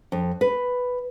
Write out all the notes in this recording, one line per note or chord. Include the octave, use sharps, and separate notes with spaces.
F2
B4